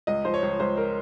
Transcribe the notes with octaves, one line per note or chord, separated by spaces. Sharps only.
C#2 D#5
F3 C5
C#5
C#2
C#2 C5
A#4